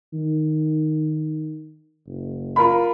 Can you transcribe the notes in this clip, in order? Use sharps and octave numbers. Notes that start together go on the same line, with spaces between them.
D#3
F#1
F4 A#4 B5